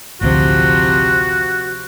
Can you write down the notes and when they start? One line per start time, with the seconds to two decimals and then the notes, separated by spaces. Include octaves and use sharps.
0.21 A1 D2 C3 F3 F#4